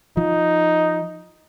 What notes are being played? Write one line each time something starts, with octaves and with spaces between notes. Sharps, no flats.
F3 D#4